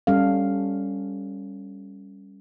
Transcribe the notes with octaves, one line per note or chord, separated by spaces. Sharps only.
G3 C#4 A4 F5